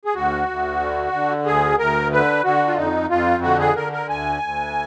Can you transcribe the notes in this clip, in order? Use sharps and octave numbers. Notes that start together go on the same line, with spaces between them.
G#4
D2 F#4
D2
D3
D3
D2 G#4
D2 A#4
D3 B4
D3 F#4
F4
F2 D#4
F2 F4
D3 F#4
G#4
D3 A#4
A#4
D2 G#5
D2